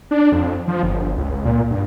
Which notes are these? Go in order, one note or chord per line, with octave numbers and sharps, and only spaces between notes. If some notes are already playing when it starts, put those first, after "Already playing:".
D4
F2
F3
G1
C#2
A#2
G2